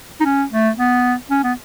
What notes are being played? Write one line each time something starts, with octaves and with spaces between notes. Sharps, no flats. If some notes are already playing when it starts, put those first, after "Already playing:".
D#4
C#4
A3
B3
C#4
B3